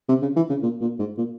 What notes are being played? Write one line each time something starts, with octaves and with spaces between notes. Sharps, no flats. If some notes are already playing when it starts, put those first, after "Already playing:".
C3
C#3
E3
C#3
A#2
A#2
G#2
A#2